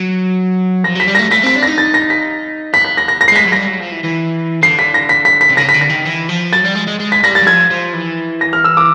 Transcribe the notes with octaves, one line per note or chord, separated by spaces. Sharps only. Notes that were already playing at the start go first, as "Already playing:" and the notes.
Already playing: F#3
F3 A#6
F#3 B6
G3
A#6
A3
A3 B6
C4 B6
D4
A#6
D#4
A6
A#6
B6
B3 B6
B6
A#6
A#6
A#6
C7
G#3 B6
F#3
G3 A#6
F#3
F3
E3
E3
D3 C7
B6
A#6
B6
B6
B6
C3
C#3 A#6
D3 B6
A#6
D#3
E3
F3
F#3 A6
G3
G#3
G#3
G#3
B6
G3 A#6
A6
F#3
F3 G#6
F3
E3
A#6
F6
E6
D6